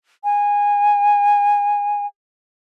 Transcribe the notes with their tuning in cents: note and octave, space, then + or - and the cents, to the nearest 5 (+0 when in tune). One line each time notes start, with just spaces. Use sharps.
G#5 -20